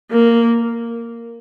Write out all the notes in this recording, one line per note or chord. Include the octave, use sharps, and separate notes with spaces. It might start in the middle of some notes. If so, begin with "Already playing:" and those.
A#3